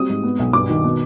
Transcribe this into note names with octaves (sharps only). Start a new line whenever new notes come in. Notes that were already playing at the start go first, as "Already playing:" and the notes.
Already playing: G3 C4 D#6
G#2
B3
B1
G2 D6
D#3
B2